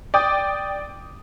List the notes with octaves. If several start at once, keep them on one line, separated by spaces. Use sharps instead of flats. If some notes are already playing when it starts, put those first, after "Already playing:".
D5 G5 D#6